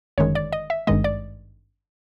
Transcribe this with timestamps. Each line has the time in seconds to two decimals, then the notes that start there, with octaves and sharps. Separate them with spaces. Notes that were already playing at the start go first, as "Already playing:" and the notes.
0.18 G1 F#2 D#3 G#3 C#5
0.35 D5
0.52 D#5
0.70 E5
0.87 G#1 G2 D#3 G#3 D#5
1.04 D5